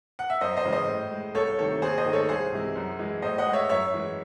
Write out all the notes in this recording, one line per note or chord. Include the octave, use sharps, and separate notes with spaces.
F#5
E5
F#2 C5 D#5
C5 D#5
C#3 E3 G#3
C5 D#5
A2
G#3
C2 A4 C#5
C3 D#3 A3 A4 C#5
D#2 G#4 C5
C5 D#5
D#3 A3
A4 C#5
C2 G#4 C5
C3 E3 G#3
F#2
E3 G#3
A2 C5 D#5
D#5 F#5
G#3
C#5 E5
F#2 C#5 E5
E3 G#3